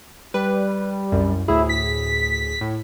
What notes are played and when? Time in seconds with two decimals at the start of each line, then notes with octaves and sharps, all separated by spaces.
0.34 G3 B4
1.12 C2 F#2
1.48 D2 A2 E4 G#4
1.69 B6
2.61 A2